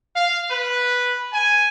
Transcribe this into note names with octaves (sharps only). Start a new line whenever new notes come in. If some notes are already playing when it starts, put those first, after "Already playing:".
F5
B4
G#5